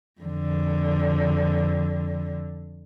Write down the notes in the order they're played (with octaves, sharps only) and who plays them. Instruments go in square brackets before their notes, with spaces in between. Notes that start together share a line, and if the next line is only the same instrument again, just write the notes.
[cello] F2 D3